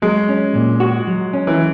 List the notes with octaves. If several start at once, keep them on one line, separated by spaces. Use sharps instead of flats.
F#3 G#3
C#4
A#2
F#4
F#3
C#4
E3